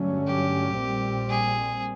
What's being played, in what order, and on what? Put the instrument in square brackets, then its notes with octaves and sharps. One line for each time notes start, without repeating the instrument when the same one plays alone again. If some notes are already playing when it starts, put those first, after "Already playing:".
Already playing: [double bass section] G2 D3 F#3 A3 C#4
[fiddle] G4
[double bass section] A#1 A#2 G3 C4
[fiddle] G#4